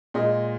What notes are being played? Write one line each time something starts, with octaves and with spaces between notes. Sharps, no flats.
A#2 G#3 D#5